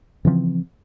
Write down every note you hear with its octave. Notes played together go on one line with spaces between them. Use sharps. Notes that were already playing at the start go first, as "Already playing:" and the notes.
C#3 E3 F3 C4